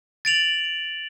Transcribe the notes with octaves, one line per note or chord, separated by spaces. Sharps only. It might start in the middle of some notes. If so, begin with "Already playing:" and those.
A6 D7 F7 F#7